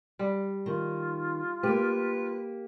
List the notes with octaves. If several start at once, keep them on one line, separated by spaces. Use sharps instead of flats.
G3
D#3 F4
A#3 G4 B4